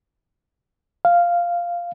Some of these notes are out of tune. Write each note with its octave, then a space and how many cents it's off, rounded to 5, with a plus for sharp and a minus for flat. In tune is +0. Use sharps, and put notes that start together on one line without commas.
F5 -5